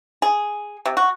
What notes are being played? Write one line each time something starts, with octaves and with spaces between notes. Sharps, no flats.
G#4
C3
F#4